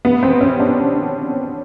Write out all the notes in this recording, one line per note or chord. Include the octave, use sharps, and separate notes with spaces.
B3
C4
C#4
D4